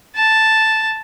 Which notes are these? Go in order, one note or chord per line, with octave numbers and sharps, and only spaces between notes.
A5